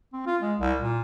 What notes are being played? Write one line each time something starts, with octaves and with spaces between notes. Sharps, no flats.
C4
F4
G#3
C2
A#2